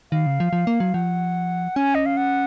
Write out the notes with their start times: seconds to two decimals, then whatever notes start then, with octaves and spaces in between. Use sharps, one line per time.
0.12 D#3 F5
0.26 C#3
0.40 F3
0.53 F3
0.67 A#3
0.80 F#3
0.94 F3 F#5
1.76 C#4 G#5
1.95 D#5
2.06 F5
2.17 F#5